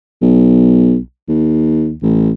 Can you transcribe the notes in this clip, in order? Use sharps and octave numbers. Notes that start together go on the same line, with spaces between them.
B1
D#2
A1